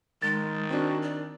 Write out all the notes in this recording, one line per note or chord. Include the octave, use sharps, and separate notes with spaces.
D#3 G#3 A6
C4 D4 F#4
D5